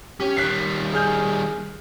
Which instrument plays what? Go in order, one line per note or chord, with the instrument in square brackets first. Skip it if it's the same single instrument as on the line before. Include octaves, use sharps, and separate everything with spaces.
[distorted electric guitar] C#4 [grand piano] G4
[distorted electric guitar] D#3 G3 [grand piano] F#6 B6 C7
[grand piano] G#4 F6 G6